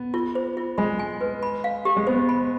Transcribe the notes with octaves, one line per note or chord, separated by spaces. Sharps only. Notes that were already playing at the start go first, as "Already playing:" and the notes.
Already playing: B3
F4
C5
F4
G#3 B5
G#5
B4
B5
F5
G4
G#3
B3 C5
B5